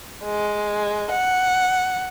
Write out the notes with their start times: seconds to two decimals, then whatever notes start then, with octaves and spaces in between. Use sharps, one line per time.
0.24 G#3
1.11 F#5